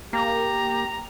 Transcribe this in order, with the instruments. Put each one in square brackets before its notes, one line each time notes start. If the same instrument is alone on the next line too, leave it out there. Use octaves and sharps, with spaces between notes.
[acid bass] A#3 [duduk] G4 [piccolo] A#5